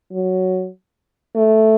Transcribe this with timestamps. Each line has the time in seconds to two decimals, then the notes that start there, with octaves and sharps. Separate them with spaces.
0.13 F#3
1.36 A3